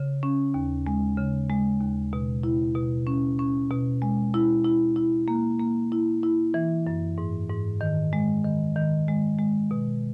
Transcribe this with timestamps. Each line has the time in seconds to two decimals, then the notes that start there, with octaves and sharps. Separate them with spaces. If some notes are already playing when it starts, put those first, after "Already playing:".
Already playing: C#3
0.23 C#4
0.54 D#2
0.87 G#3
1.18 C#3
1.50 G#3
1.81 D#2
2.13 B2
2.43 E4
2.75 B2
3.07 C#4
3.39 C#4
3.71 B2
4.02 G#3
4.34 E4
4.64 E4
4.96 E4
5.28 A#3
5.60 A#3
5.92 E4
6.23 E4
6.54 E3
6.87 F#2
7.18 G#2
7.50 G#2
7.81 D#3
8.13 G#3
8.44 D#3
8.76 D#3
9.08 G#3
9.39 G#3
9.71 B2